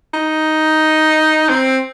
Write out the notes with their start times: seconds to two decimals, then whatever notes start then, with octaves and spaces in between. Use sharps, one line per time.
0.13 D#4
1.49 C4